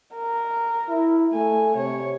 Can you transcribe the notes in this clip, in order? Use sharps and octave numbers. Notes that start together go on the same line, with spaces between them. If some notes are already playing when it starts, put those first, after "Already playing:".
A#4
E4
A3 G#5
C3 C#5